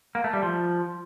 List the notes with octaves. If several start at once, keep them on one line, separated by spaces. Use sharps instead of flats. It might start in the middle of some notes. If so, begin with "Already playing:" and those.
A#3
A3
G3
F3